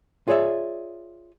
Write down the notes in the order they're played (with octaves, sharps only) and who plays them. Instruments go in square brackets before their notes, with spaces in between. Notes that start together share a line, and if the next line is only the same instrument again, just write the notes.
[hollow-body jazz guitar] F4 G#4 C#5 D5 E5